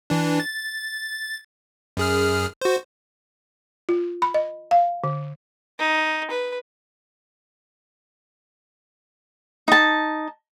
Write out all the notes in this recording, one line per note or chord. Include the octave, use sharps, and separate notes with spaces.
E3 D4
A6
F#2 G#4 F6
F#4 C5
F4
B5
D#5
F5
D3
D#4
B4
D#4 A5